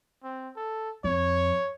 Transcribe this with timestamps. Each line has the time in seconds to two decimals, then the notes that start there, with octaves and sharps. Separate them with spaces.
0.23 C4
0.56 A4
1.04 F2 C#5